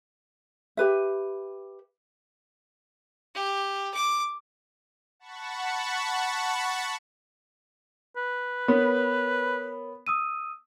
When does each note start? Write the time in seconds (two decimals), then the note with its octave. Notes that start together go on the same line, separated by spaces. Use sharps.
0.77 G4 B4 E5
3.35 G4
3.94 D6
5.20 F#5 A5 B5 C#6
8.16 B4
8.68 B3 A#4 C#5
10.07 D#6 E6 D#7